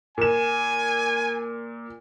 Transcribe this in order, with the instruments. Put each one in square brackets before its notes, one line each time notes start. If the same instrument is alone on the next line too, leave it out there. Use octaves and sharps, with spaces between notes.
[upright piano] A#2 E7 [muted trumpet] G#5